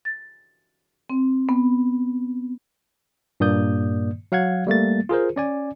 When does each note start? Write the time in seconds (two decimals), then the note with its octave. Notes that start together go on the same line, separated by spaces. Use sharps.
0.05 A6
1.10 C4
1.49 B3
3.40 G2 A#2 A#3 D5 D#6 G6
4.32 F#3 F5 F#5 G#6
4.67 G3 A3 A#3 A6
5.09 F4 G#4 A#4 C5
5.36 C#4 D5 G#5